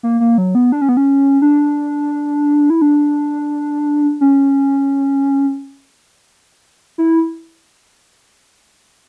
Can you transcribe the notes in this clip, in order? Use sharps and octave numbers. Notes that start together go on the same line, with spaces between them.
A#3
A#3
F#3
B3
D4
C#4
B3
C#4
D4
E4
D4
C#4
E4